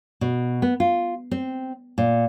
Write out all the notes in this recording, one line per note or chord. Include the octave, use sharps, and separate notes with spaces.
B2
B3
F4
C4
A#2